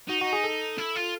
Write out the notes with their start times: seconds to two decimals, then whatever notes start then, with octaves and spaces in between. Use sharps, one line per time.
0.09 D#4 F#4
0.21 F#4
0.33 G#4
0.44 A4
0.78 E4
0.96 F4